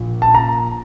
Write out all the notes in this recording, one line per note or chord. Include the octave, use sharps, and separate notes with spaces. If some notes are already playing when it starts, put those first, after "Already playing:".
Already playing: A#1
A5
A#5